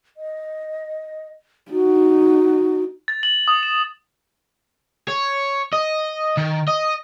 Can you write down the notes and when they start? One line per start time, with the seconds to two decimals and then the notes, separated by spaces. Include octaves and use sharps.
0.17 D#5
1.71 D#4 F#4
3.08 A6
3.23 F#7
3.48 D#6
3.63 E7
5.08 C#5
5.73 D#5
6.37 D#3
6.68 D#5